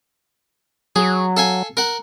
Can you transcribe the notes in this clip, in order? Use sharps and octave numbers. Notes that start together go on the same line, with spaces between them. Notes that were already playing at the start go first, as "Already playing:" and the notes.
F#3 G#4
A4 F5 G#5
A#4 F#5